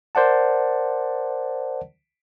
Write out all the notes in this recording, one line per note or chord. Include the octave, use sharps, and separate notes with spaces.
A#4 C5 D5 F#5 A5